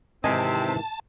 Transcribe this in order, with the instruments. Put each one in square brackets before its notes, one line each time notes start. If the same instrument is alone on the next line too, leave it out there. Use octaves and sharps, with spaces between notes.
[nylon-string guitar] G#2 D#3 E3 [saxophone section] C3 C4 [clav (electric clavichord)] D#5 G#5 [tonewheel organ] A5